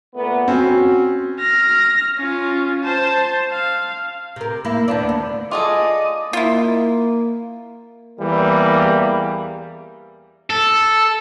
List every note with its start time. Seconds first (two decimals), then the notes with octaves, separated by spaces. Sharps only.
0.15 A#2 A3 B3
0.48 C4 C#4 F#4
1.39 F6 A#6
2.17 C#4 F4
2.84 C5 A5
3.52 F5
4.36 C3 A#4
4.65 A#3 E4
4.88 D#2 B3 D4
5.09 D2
5.51 F4 G#4 A4 D5 D#5 D#6
6.33 A#3 E4 F4
8.19 E2 E3 G3 A#3
10.50 A4